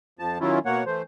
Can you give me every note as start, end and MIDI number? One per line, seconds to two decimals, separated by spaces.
0.19 0.38 41
0.19 0.38 53
0.19 0.38 81
0.40 0.59 51
0.40 0.59 54
0.40 0.59 61
0.40 0.59 64
0.40 0.59 65
0.66 0.84 47
0.66 0.84 58
0.66 0.84 73
0.66 0.84 78
0.86 1.02 52
0.86 1.02 57
0.86 1.02 72